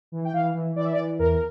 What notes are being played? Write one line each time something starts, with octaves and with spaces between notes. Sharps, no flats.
E3
G5
E3 F5
E3
E3 D5
E5
D5
E3
E2 A#4